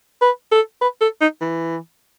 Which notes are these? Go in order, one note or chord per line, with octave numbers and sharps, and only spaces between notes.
B4
A4
B4
A4
D#4
E3